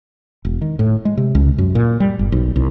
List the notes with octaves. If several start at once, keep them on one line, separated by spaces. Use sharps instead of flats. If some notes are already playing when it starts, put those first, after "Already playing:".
E1
D#3
A2
G#3
C3
C#2
F#2
A#2
G3
G1
B1
C2